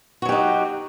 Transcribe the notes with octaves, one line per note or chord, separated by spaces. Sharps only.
F#3 D#4 F#4 G4